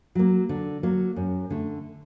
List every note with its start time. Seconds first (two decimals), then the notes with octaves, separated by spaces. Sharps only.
0.15 F#3 A#3
0.49 D3
0.83 F#3 A#3
1.16 F#2
1.50 D3 A3